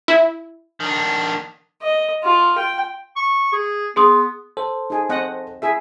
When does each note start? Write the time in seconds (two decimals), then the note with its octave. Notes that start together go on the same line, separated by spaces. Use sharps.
0.08 E4
0.80 D#3 D4
1.82 D#5
2.24 F4
2.58 G5
3.16 C#6
3.53 G#4
3.96 B3 G#4 C6 D#6
4.57 A4 C5
4.90 D#4 G#4
5.10 C4 D#5 F#5
5.62 E4 G#4 E5